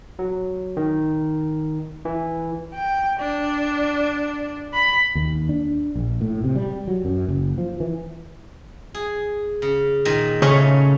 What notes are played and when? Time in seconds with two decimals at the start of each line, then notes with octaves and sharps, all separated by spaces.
0.19 F#3
0.77 D#3
2.05 E3
2.74 G5
3.19 D4
4.74 B5
5.15 D#2
5.49 D4
5.96 A#1
6.21 A2
6.44 C3
6.56 G3
6.88 F#3
7.05 F#2
7.29 F#1
7.58 F3
7.80 E3
8.94 G#4
9.62 C#3
10.05 A#2 D#3
10.42 A#2 C#3 A3 C#4 C#5